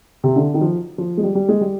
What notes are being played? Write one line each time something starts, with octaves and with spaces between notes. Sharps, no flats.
C3
D3
D#3
F3
F3
G#3
G3
G3
G#3
G3